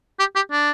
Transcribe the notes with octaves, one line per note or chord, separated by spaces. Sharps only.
G4
G4
D4